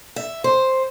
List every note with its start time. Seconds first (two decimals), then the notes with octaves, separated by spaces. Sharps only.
0.16 E5
0.44 C5